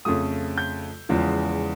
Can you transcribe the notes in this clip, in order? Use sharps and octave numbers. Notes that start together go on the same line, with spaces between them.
F2 C#3 F3 A3 D#6
G6
E2 C#3 F3 G#3